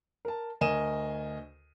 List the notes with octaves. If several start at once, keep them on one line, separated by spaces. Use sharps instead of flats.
A#4 A5
D2 A#4 D#5 G#5 D#7 E7